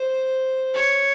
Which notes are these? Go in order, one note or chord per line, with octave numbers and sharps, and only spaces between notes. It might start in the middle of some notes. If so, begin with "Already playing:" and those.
Already playing: C5
C#5